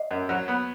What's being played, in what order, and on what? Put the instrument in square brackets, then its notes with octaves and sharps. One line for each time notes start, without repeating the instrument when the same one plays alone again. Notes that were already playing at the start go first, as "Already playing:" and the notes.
Already playing: [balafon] D#5
[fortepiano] F#2
F#3
B3